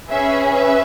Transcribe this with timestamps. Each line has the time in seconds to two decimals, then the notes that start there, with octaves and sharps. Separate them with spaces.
0.10 C#4 G#4 B4 E5
0.54 B4 E5